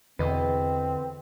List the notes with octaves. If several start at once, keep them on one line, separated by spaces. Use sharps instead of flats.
E2 D3 C4 B4 D#5